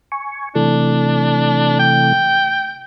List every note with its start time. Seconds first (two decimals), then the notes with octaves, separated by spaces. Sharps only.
0.12 G#5 C#6
0.55 C3 E3 A3 D4
1.79 G5